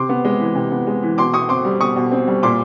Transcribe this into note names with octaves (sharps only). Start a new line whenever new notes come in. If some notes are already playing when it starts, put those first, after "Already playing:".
Already playing: C3 C6 D6
B3
G#3
E3
C3
B3
G#3
E3
B2 C6 D6
B2 C#6 D#6
C4 C6 D6
G3
B2 C#6 D#6
B2
C4
G3
A#2 C6 D6